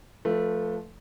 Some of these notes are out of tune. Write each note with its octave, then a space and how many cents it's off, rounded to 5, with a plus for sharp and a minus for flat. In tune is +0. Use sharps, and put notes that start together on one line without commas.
F3 +0 A3 +0 B4 -25